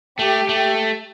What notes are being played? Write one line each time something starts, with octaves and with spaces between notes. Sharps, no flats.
A3 G4
A3